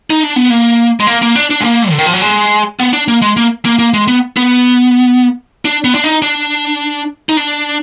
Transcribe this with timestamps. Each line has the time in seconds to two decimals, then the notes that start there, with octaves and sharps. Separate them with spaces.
0.10 D#4
0.23 D4
0.36 B3
0.50 A#3
1.00 G#3
1.07 A#3
1.22 A#3
1.36 D4
1.51 D4
1.61 G#3
1.65 A#3
1.91 D3
1.98 D#3
2.06 F3
2.13 F#3
2.22 G#3
2.80 B3
2.93 D4
3.08 A#3
3.22 G#3
3.37 A#3
3.65 A#3
3.79 A#3
3.94 G#3
4.08 B3
4.37 B3
5.65 D4
5.84 B3
5.95 D4
6.04 D#4
6.22 D4
7.29 D#4
7.37 D4